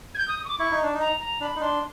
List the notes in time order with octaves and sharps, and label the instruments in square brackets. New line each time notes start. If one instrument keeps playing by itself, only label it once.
[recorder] G#6
G6
D#6
D#6
C#6
D6
[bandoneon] E4 [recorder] C#6
[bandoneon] D#4
D4
D#4
[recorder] A#5
A#5
[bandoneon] D4 [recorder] B5
[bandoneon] D#4
[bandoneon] D4 [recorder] C6